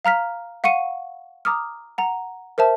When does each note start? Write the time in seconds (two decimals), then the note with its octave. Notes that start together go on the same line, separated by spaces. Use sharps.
0.05 F5 A#5 F6 B6
0.64 F5 F#5 C#6 C#7 D#7
1.45 A#5 D6 D#6 F6
1.98 F#5 A#5
2.58 A#4 C5 E5 A5